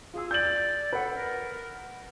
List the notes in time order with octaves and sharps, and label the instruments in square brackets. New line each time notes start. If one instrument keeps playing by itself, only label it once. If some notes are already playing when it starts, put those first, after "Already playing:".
[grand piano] F4 E6 [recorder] G#4
[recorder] D5 [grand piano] G6 F#7
[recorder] A4 [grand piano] B4 F#5
[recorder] A#4